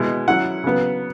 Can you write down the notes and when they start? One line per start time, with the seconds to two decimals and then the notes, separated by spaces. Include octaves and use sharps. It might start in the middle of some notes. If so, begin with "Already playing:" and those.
Already playing: B2 G#3 B3 E4
0.28 F#3 C#4 E4 F#5
0.64 C#3 F#3 B3